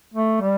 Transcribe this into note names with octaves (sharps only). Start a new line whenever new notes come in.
A3
G3